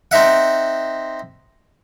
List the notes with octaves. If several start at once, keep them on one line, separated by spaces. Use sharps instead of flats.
C4 D#4 E5 F#5